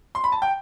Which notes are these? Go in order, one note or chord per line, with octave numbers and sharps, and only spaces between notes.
C6
B5
A5
G5